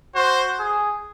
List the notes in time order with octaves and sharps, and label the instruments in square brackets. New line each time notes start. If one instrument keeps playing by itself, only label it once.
[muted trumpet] F#4 [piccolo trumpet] C5
[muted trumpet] G#4